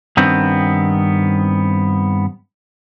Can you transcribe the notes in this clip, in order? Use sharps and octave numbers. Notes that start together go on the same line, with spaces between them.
G2 D#3 B3 C4